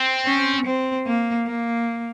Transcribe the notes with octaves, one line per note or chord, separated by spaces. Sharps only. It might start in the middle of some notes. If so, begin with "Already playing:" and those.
Already playing: C4
C#4
C4
A#3
A#3